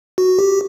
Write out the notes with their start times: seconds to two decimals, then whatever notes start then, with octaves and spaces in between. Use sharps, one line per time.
0.18 F#4
0.39 G4